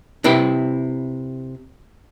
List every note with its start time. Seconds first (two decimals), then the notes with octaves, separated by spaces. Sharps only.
0.24 C3 E4 B4 G5